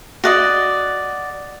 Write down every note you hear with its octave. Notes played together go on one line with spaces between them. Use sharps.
F#4 D5 D#5